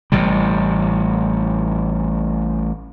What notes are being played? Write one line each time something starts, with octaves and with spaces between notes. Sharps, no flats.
A1 A2 C3 G3